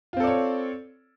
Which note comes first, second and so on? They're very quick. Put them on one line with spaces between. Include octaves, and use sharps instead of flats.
F4 C4 A4 D5 C#5